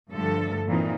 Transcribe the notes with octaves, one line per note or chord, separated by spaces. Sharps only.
G2 D3 F3 A3 A4
A#2 E3 C4 D#4